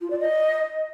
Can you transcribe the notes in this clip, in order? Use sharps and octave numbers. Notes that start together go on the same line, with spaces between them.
F4
D5
D#5